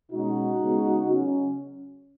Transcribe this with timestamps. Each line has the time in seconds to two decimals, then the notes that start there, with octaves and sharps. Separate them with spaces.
0.11 B2 G#3 C#4 D#4 F#4
0.60 C#3 G#3 B3
1.09 C#3 F#3 C#4